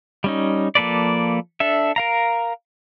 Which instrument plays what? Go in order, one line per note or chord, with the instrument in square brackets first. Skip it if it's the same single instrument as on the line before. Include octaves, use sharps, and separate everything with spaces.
[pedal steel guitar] G3 C#4 D#4
F3 A#3 A4 B4 D5
D4 A4 E5
A#4 F5 A#5